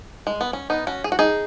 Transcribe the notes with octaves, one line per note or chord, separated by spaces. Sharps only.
G#3
B3
C#4
B3 D#4
C#4 F#4
G#4
F#4
D#4 G#4